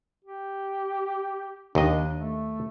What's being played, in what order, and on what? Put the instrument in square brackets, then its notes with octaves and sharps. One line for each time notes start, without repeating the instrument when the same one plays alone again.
[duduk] G4
[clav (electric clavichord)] D#2 D#5 [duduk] D4
[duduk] A3